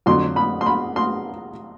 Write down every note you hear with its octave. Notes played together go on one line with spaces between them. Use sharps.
F2 D3 F#3 C6
B5
C6
B5
C6